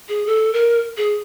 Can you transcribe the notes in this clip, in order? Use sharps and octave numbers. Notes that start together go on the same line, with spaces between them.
G#4
A4
A#4
G#4